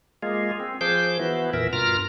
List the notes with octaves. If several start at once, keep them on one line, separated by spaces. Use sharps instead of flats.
G#3 A#3 F4 G#4
C4
F3 G#4 C5 D6 G6
E3 B3 E4 F#4
F2 A#2 E3 A#4 E5
G2 B2 F4 A#4 A#5 F6